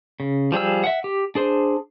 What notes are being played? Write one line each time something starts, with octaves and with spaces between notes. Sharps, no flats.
C#3
F3 G3 G#4 E6
E5 F#5
G4
D4 G#4 C5